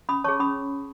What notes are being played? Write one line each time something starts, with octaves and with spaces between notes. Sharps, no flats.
C#4 B5 D#6
G#4 C#5 A5 C#6
C#4 B5 D#6